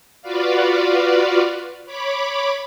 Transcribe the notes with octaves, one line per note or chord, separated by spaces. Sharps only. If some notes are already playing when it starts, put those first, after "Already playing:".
F4 F#4 B4 D5 F5
C#5 B5 D6